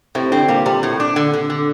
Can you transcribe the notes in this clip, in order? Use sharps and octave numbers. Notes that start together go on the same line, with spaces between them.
A2 C3
D3 C4
A#2 G3
C3 G3
A2
D4
D3
D3
D3